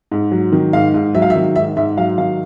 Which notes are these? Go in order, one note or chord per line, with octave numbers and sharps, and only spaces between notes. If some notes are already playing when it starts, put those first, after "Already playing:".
G#2
F#3
D#3
G#2 F5
G#2
F#3 E5
F5
E5
D#3
G#2 E5
G#2 E5
F#3 F5
D#3 F5